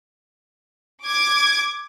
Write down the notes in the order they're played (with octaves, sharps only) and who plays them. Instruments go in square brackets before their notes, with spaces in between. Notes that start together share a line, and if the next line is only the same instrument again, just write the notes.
[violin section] D6 G#6